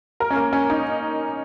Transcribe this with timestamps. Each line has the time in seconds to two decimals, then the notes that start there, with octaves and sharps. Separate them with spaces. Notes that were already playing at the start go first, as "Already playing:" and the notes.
0.20 A#4
0.31 C#4
0.36 A#3
0.53 C#4
0.70 D#4